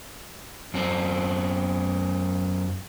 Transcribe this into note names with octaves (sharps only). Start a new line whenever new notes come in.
F#2 C4